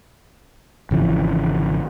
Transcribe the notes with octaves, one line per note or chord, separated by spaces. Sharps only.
G#1 C#3 E3 F3